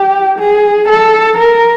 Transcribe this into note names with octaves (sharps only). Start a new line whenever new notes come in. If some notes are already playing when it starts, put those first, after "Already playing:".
Already playing: G4
G#4
A4
A#4